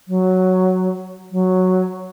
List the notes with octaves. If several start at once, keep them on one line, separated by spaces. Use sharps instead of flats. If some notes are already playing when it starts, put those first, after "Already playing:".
F#3
F#3